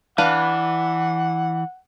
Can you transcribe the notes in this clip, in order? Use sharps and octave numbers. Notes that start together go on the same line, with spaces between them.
E3 D4 B4 F5 F#5